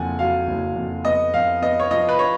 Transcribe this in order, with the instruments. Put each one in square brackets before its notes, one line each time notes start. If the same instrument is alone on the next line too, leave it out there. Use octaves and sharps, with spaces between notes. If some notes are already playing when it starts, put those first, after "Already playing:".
Already playing: [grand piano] F#1 F2 [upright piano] F#5 G#5
[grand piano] F#3 [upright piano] F5
[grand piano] F#1
F2
[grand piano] B3 [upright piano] D#5
[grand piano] F2 [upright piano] F5
[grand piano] B3 [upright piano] D#5
[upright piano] C#5
[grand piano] F3 [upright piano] D#5
[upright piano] B4
C#5